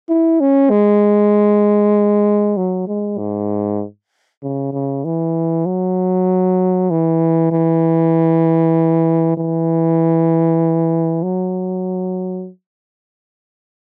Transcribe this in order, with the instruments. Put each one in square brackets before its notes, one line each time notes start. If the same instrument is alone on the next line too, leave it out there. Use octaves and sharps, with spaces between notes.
[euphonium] E4
C#4
G#3
F#3
G#3
G#2
C#3
C#3
E3
F#3
E3
E3
E3
F#3